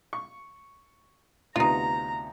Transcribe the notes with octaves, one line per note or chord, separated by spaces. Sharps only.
C#6
D2 C3 B3 D#4 F4 A#5